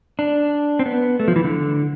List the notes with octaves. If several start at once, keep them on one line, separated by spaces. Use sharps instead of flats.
D4
C4
B3
A3
F3
E3
D3